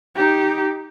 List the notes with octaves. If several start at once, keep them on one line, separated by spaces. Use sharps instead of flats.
D#4 G4